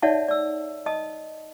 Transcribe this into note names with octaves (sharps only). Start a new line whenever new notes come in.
D#4 C#5 D5 E5 F#5 A5
D5 E6
D#5 A5 D#6